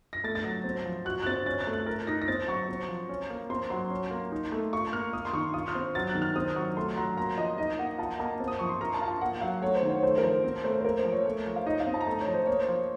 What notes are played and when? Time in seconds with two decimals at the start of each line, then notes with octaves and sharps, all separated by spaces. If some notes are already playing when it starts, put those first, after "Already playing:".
0.13 A#6
0.24 A3 A6
0.35 A6
0.44 F#3 A#6
0.64 C4
0.86 F3
1.05 F#4 F#6
1.22 F#6
1.26 C4 A6
1.46 C#4 A6
1.60 A6
1.67 A3
1.73 F#6
1.86 A#4 A6
2.07 D#4 A#6
2.22 A#6
2.28 C4 A6
2.48 F#3 C#6
2.68 C4
2.88 F3
3.09 C#4
3.30 A#3
3.50 C4 C6
3.70 F#3 C6
3.90 C#4
4.11 A#3
4.32 D#4
4.52 A3
4.73 F4 C#6
4.92 A#3 F6
5.13 A#3 D#6
5.25 C6
5.33 D#3 C#6
5.54 F4 D#6
5.68 F6
5.75 C4
5.95 F#3 A6
6.09 F#6
6.15 D#3
6.22 F6
6.36 C4 D#6
6.56 F#3 C#6
6.77 A3 C6
6.96 F#3 A#5
7.17 A#3 A#5
7.38 F3 D#5
7.58 D#4 D#5
7.79 A#3 F#5
7.98 F4 A5
8.20 A#3 A5
8.40 C4
8.48 D#6
8.59 F3 C#6
8.69 C6
8.81 A#4 A#5
8.94 A5
9.02 F4
9.08 A5
9.21 A#3 F#5
9.41 F#3 F5
9.62 A3 C#5
9.75 C5
9.83 D#3
9.90 C5
9.98 C#5
10.03 A3 C5
10.18 A#4
10.23 F3 C5
10.44 C4
10.64 A3 C5
10.81 C5
10.84 A#3 A#4
10.98 C5
11.04 F3
11.12 C#5
11.26 A3
11.46 F3
11.56 F5
11.66 D#4 D#5
11.80 F5
11.87 C4
11.94 A5
12.01 A#5
12.06 A3 A5
12.21 C#5
12.27 F3
12.34 C5
12.46 A#3 C#5
12.59 C5
12.68 F3